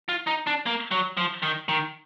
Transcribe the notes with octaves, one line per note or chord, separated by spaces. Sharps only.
F4
D#4
D4
A#3
F#3
F3
D#3
D#3